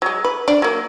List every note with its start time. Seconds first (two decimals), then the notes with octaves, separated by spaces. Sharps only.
0.02 F#3 G#3
0.24 B4
0.48 D4
0.62 F#3 A#3